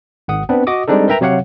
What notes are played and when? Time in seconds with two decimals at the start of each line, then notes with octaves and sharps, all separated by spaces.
0.28 G#1 F#5 D#6
0.49 B3 C4 D4 B4
0.67 F#4 D#5 D6 D#6
0.88 G3 G#3 C4 D4 D#4 A4
1.08 A#4 B4 E5 G5 A#5
1.21 C3 F#3 G4 C#5 F5 F#5